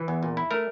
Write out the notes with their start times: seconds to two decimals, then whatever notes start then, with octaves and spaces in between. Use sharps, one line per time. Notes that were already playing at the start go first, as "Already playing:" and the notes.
Already playing: E3
0.08 E2
0.23 A#2
0.37 E4
0.51 A3 A#4